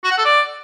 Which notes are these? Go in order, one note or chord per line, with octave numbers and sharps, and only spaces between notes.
F#4
F#5
A4
D5